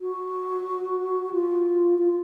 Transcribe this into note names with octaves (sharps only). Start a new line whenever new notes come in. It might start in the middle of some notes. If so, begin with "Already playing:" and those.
F#4
F4
F4